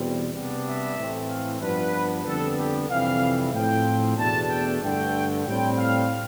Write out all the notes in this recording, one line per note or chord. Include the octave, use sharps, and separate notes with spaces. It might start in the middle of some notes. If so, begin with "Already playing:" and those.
Already playing: E2 B2 G3 C4
C3 G3 B3 D4
E5
A2 E3 A3 C4
F5
G2 F3 B3 D4 B4
F2 D3 G3 B3 A4
G4
F2 C3 E3 G3 F5
A2 F3 C4 G5
E2 B2 A3 D4 A5
G5
G2 D3 A3 G5
A2 G3 C4 G5
F5